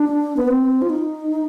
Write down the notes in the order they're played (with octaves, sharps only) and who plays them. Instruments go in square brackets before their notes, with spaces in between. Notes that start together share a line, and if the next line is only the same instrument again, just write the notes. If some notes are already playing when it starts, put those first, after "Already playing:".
Already playing: [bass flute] D4
B3
C4
F4
D#4